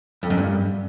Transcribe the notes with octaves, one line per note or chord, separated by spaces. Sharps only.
F2
F#2
G2